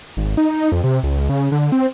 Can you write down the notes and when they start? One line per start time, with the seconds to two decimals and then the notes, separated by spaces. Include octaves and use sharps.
0.17 G#1
0.37 D#4
0.72 F2
0.84 C3
1.03 C#2
1.29 C#3
1.52 D3
1.72 C4